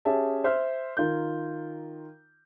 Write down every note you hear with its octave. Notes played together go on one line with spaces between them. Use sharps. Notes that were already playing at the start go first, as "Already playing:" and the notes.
C#4 G4 G#4 E5 A5
C5 E5 F6 G6
D#3 F4 A#4 G6